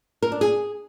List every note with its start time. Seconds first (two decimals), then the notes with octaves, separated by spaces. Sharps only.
0.22 A#4
0.32 D4
0.41 G#4